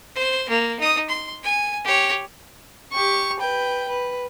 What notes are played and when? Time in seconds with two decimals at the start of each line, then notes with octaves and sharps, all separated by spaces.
0.15 C5
0.49 A#3
0.80 D#4 D#6
1.09 C6
1.43 G#5
1.84 G4 C#5
2.92 G4 C#6
3.40 B4 G5
3.88 B4